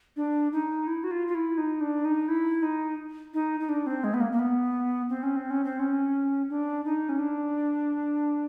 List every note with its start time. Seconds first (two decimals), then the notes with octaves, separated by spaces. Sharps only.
0.17 D4
0.52 D#4
0.87 E4
1.04 F#4
1.11 F4
1.28 F4
1.35 E4
1.58 D#4
1.81 D4
2.05 D#4
2.28 E4
2.63 D#4
3.34 D#4
3.60 D#4
3.69 D4
3.87 C4
4.04 G#3
4.14 B3
4.20 A#3
4.32 A#3
4.39 B3
5.09 C4
5.23 C#4
5.36 C4
5.50 C#4
5.65 C4
5.79 C#4
6.50 D4
6.85 D#4
7.09 C#4
7.19 D4